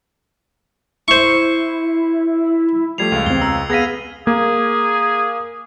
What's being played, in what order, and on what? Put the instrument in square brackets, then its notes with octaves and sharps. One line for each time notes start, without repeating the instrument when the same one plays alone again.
[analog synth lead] E4 [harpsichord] C5 C#6
[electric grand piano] F3 G3 A3 [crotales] G#6 C7 F7
[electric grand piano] C#2 F5
[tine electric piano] E2 C4 [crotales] G7
[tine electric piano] A#5 [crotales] E6
[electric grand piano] B3 A#6 B6 [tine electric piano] G#4 F5 [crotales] G#6 D#7
[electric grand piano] A#3 [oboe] G#4